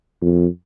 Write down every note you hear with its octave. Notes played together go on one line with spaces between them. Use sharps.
F2